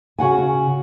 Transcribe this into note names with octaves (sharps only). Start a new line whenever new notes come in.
C#3 F#4 F#5 G#5